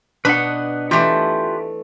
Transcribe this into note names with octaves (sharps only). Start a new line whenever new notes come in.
B2 D4 D#4 B4 F#5
E3 A3 F4 G4 B4